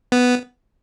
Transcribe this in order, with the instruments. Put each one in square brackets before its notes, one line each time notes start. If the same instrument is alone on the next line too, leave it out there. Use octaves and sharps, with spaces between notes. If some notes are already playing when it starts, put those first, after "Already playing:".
[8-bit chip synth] B3